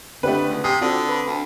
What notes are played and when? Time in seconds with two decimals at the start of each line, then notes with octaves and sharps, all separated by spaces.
0.23 D3 A3 B3 C4 D4 G4 B4
0.49 C#2
0.64 C3 G#5 D#6
0.81 D3 C4 F4 F#4 D5
1.09 B4 B5
1.26 D2